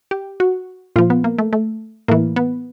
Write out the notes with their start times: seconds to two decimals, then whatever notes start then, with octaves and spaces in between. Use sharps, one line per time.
0.11 G4
0.40 F#4
0.96 A#2 F3 F4
1.10 B3
1.24 A#3
1.38 A3
1.53 A3
2.08 A2 E3 A#3
2.36 B3